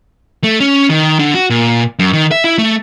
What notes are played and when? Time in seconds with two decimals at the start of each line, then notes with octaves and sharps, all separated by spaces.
0.44 A3
0.60 C#4
0.90 D#3
1.19 D3
1.35 F#4
1.50 A#2
1.99 F#2
2.13 D#3
2.31 E5
2.44 E4
2.58 A3